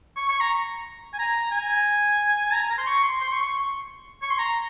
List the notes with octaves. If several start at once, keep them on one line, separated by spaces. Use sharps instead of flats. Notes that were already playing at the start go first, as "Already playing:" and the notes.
C#6
C#6
A#5
G#5
A#5
G#5
A#5
A#5
C6
C#6
C6
C6
C#6
C#6
C#6
C6
A#5